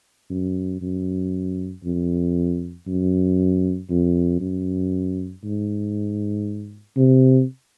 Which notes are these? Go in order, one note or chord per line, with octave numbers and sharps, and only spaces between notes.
F#2
F#2
F2
F#2
F2
F#2
G#2
C3